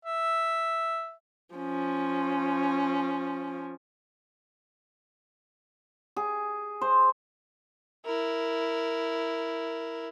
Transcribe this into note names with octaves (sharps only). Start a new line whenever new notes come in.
E5
F3 C#4
G#4
C5
E4 A#4